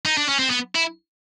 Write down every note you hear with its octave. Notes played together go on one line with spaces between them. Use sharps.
D#4
D4
C#4
C4
B3
E4